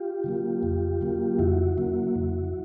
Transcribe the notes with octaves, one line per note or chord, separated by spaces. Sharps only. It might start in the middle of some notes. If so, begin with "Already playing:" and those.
Already playing: F4 G4
C#3 F#3 A#3
F2
C#3 F#3 A#3
F2 E4 F#4
C#3 F#3 A#3
F2